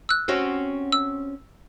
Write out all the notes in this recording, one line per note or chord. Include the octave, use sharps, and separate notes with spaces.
E6 F#6
C4 C#4 F#4
E6